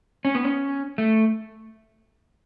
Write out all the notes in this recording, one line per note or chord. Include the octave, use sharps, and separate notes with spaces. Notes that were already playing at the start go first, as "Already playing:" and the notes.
C#4
B3
C#4
A3